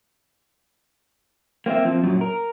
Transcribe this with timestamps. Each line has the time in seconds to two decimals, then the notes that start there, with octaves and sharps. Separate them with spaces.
1.66 A#3 C4 F#4 E5
1.85 F3 C4
2.04 F#2 A#2 F#3
2.21 A#4